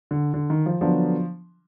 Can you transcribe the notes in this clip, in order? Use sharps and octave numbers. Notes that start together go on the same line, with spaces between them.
D3
D3
D#3
F3
D3 F3 F#3 B3 D4